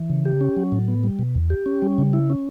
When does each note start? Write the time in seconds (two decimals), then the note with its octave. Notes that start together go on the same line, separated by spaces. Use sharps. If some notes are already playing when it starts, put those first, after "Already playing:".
Already playing: E3
0.10 C#3
0.25 G4
0.41 C#4
0.57 F#3
0.72 A2
0.88 B3
1.04 G3
1.19 B2
1.35 E2
1.50 G4
1.66 C#4
1.82 G3
1.98 C#3
2.13 E4
2.30 C#4